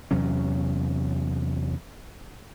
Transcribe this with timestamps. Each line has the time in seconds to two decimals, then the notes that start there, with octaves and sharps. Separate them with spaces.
0.11 E2 C3 F#3 C#4